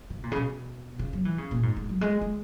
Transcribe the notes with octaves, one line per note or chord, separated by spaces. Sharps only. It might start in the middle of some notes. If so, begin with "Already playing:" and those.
C#3
A#2
C#3
B2
C#3
F#3
E3
C#3
A#2
G#2
G#2
F#3
G#3
G#3